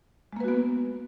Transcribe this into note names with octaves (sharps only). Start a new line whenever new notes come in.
G#3 A#3 B3 F#4 B4